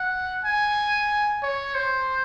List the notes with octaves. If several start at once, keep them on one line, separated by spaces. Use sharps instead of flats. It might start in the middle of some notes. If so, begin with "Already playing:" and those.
Already playing: F#5
G#5
C#5
C5